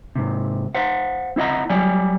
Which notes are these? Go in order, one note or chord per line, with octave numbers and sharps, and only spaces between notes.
G#2 C3
C5 F5 F#5
C4 E4 D#5 F#5 A#5
F#3 G3 D5 G5 G#5